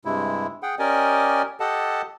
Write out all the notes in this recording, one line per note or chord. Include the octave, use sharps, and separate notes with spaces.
G2 C3 G#3 E4
G#4 F#5 G5
C#4 G4 A#4 D5 D#5 G#5
G4 A4 D#5 F#5 A5